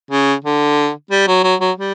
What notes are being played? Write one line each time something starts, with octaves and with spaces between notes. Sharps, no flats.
C#3
D3
G3
F#3
F#3
F#3
G3